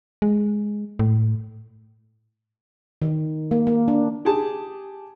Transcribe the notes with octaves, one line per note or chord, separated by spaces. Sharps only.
G#3
A2
D#3
A#3
A#3
D4
G4 G#4 A5